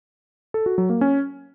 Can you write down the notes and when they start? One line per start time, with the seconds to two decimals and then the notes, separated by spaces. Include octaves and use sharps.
0.54 A4
0.66 F#4
0.78 F#3
0.90 A#3
1.01 C#4